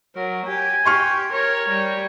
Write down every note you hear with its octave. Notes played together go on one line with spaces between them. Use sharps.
F#3 A#4
G4 G#5
G4 C6 C#6 F6
A#4 C#5
G3